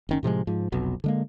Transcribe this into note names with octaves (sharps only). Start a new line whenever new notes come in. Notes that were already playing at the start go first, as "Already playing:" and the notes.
F#1 D#3 C#4
A2 C3 F3 G#3
G#2 F3
F1 B1 B2
D3 G#3 A#3